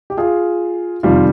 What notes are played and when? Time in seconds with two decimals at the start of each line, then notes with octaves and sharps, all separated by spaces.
0.10 G4
0.17 F4 G#4
1.03 F2 C3 D#3 G3 F4